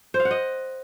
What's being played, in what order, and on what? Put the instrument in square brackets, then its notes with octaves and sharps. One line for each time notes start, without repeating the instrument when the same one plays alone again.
[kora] C5
F5
F#5
D#5